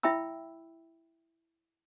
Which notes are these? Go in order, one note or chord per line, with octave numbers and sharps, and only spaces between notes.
E4 E5 G5 B5 E6